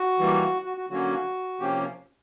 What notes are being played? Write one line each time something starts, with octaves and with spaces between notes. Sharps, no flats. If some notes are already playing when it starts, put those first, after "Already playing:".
Already playing: F#4
E3 G3 A#3
F#4
F#4
D3 F#3 A#3 C#4 F#4
C3 F3 A#3 C#4 G4